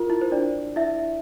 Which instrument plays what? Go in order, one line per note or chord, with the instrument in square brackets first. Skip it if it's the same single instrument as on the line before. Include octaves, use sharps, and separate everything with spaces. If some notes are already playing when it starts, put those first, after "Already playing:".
Already playing: [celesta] F4 A#4
E4
C5
D4 D5
E4 E5